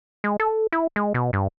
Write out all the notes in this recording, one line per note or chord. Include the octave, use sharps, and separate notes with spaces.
G#3
A4
E4
G#3
B2
G2